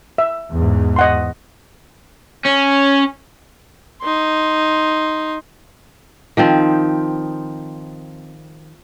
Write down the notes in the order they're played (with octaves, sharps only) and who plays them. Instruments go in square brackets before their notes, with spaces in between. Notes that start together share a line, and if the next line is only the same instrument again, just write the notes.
[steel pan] E5
[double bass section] E2 G#2
[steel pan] D#5 F#5 C6
[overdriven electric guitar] C#4
[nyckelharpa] D#4 C6
[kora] D#3 F3 C4